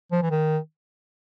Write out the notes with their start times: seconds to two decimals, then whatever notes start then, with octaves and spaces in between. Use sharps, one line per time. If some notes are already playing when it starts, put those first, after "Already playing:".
0.12 F3
0.22 E3
0.31 D#3